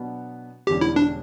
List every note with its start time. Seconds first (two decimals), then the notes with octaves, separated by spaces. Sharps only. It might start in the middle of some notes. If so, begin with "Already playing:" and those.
Already playing: B2 F#3 B3 D4
0.67 E1 E2 D3 G3 C#4 G4
0.81 E4
0.96 D4